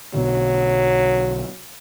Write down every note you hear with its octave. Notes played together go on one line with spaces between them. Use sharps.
B1 B2 D3 F#3